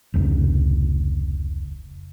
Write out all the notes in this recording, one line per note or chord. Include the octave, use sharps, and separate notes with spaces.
F1 C#2